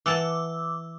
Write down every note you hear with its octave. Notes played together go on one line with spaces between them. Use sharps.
E3 F#5 A5 D6 E6